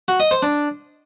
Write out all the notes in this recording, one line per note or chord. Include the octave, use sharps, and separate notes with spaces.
F#4
D#5
C5
D4